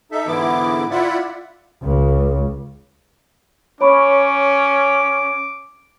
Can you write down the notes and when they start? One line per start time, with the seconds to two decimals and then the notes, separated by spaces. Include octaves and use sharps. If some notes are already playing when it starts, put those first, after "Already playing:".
0.12 D#4 A4 E5
0.27 G#2 D3 E3 B3 E4 D6
0.91 E4 F4 D5 E5 F#5
1.82 C#2
3.81 C#4 C#5 B5 C#6 D6